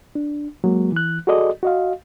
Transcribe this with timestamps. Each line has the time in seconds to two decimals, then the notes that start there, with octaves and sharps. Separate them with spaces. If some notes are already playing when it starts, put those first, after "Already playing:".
0.15 D4
0.64 F#3 G#3 A#3
0.92 E3 F#6
1.27 F#4 G#4 A4 D5 D#5
1.63 F#4 D#5 F5